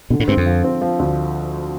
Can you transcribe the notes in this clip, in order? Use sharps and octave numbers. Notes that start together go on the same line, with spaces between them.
B2 D3
A2
G2 C4
F2
F3
C4
F3
D2